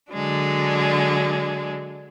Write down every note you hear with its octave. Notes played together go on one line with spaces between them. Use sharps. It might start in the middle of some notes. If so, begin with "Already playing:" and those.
D3 F#3 G#3 D4